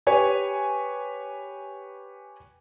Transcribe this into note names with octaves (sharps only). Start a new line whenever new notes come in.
G4 B4 C#5 G#5